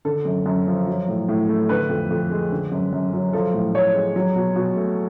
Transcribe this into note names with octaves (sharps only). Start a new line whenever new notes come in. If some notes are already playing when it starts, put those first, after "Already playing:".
D3 A4
F#2
F#2
F3
F#3
A2
A2
A3
D3 B4
F2
F2
G#3
D3
F#2
F#2
F#3
F3 A4
A2
A2 C#5
G#3
F#3
B2
B2
A3